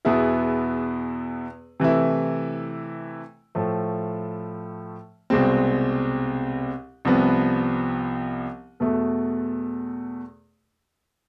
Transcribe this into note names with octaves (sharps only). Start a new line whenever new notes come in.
E2 B2 B3 E4 G#4
C3 E3 A3 E4
A2 F3 A3
C2 B2 G#3 C4
C2 C3 F3 B3
E2 B2 A3